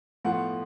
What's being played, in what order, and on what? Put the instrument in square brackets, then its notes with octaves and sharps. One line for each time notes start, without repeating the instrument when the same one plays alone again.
[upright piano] A2 F3 B3 F#5